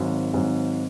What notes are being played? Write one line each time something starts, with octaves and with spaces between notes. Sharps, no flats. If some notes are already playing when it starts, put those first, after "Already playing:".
Already playing: G#1 G#2 F#3
G#1 G#2 F#3